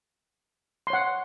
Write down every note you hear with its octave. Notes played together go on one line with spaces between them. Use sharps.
C#5 F#5 C6